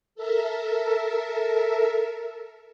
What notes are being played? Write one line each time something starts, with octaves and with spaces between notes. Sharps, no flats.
A4 A#4 E5